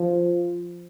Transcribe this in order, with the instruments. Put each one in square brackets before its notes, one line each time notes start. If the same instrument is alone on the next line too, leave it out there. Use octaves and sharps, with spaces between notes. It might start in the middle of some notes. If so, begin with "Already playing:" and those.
Already playing: [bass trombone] F3